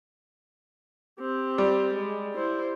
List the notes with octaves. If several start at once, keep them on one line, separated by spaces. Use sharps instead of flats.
C4 G4
G3
G#3
E4 C5